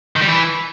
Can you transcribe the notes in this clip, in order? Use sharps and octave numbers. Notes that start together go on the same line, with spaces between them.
D#3
G3
E3